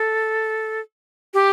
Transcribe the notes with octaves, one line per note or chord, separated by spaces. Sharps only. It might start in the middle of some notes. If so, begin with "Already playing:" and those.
Already playing: A4
G4